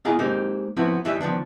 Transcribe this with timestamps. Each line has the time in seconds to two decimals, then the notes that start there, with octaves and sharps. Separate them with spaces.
0.05 B3 E4 F4 G#4 D#5 A#5
0.19 G#3 A#3 C4 D#4 G4
0.77 F3 B3 C4 E4 F#4
1.05 D#2 E3 G3 D#5 E5
1.21 D#3 F3 B3 D4